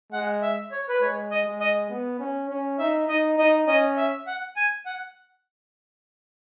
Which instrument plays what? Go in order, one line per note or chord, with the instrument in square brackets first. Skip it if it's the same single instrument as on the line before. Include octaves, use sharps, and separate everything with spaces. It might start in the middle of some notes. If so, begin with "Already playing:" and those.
[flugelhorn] G#3 [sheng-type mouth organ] F#5
[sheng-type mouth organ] E5
C#5
B4
[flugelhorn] G#3 [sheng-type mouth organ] C#5
[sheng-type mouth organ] D#5
[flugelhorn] G#3
[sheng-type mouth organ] D#5
[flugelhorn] B3
C#4
C#4
[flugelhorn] D#4 [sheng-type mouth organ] E5
[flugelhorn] D#4 [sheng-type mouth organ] D#5
[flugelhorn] D#4 [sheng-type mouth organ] D#5
[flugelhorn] C#4 [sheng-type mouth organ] D#5
[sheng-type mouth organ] E5
F#5
G#5
F#5